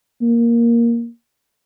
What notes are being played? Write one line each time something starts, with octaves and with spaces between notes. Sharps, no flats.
A#3